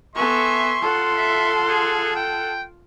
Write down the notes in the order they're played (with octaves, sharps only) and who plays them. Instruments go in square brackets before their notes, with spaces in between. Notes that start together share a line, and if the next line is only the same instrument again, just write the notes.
[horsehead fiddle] B3 A4 [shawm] E5 [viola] G#5 C#6 [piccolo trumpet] C6
[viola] F4 [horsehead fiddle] A4 F#5
[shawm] E5
G#4
G5